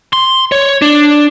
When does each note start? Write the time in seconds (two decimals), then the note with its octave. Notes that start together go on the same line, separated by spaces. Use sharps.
0.13 C6
0.52 C#5
0.82 D4